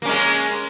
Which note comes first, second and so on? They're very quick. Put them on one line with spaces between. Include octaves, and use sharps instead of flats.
A#3 C#4 G#3